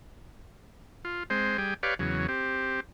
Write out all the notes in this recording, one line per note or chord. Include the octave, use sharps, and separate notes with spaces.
F4
G#3 C4 C5
G3 G#4 G5
G4 B4 C#5 D5 F5
E2 C#3 F#3
C4 G4